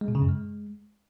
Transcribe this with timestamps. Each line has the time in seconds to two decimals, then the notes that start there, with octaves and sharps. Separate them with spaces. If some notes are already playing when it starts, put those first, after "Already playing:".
0.01 G#3
0.08 B2
0.15 C#3
0.22 F#2
0.29 G#3